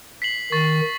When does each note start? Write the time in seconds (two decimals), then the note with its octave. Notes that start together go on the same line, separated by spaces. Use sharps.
0.22 B6 C7 F#7
0.52 D#3 C#6 A6